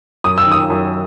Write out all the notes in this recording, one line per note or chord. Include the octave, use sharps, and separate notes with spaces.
F#2 D#6
E6
D#3
D#6
F#2